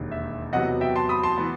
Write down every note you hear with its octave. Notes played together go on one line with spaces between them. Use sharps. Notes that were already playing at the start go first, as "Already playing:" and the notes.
Already playing: E1 D#2 D#3
E5
E2 C3 F#3 B3 D#5 F#5
E5 G5
A5 C6
B5 D#6
A5 C6
E3 B3